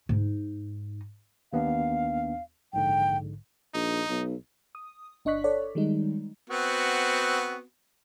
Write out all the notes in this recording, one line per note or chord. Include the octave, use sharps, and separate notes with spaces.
G#2 D#4
D#2 B3 D4 F5
A#1 G#2 D3 G5
A#1 D#4
B1
D#6
G1 D4 D#5 C#6 F#6 B6
A4 C#5 D5
D#3 G3 G#3 D#4
B3 C4 F#4